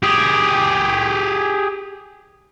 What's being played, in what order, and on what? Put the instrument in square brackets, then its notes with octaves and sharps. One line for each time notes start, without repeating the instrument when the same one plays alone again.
[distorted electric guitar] G4 G#4